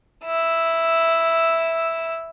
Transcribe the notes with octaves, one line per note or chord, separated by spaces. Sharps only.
E4 E6